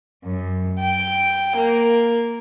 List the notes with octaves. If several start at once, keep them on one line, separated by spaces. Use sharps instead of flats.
F#2
G5
A#3